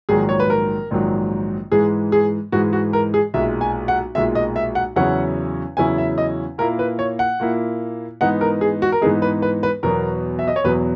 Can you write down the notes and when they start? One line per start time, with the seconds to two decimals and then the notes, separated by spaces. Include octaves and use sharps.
0.09 A#1 G#2 D#3 F#3 G#4
0.29 C#5
0.40 B4
0.50 A#4
0.91 A#1 G#2 D#3 F#3
1.72 G#2 E3 G#3 G#4
2.12 G#4
2.52 G#2 E3 G#3 F#4
2.73 F#4
2.93 A#4
3.14 G#4
3.34 B1 A#2 G#3 E5
3.61 G#5
3.88 F#5
4.15 B1 A#2 G#3 E5
4.35 D#5
4.56 E5
4.75 F#5
4.96 E2 C#3 F#3 C#4 E4 F#5
5.77 E2 C#3 F#3 C#4 E4 G#5
5.98 E5
6.18 D#5
6.58 A#2 A#3 E4 A#4
6.79 B4
6.99 C#5
7.19 F#5
7.40 A#2 A#3 E4
8.21 G#2 E3 B3 D#4 F#5
8.41 A#4
8.61 G#4
8.82 F#4
8.92 A#4
9.02 G#2 E3 B3 D#4 G#4
9.22 B4
9.42 B4
9.63 B4
9.83 E2 B2 F#3 B3 A#4
10.39 E5
10.48 D#5
10.56 C#5
10.64 E2 B2 F#3 B3 B4